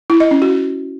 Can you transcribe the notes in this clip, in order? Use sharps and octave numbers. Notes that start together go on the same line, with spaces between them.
E4
D#5
C#4
F#4